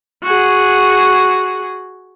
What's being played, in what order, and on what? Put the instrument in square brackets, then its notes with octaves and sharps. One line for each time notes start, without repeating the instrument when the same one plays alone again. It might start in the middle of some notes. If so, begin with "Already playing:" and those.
[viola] F#4 G#4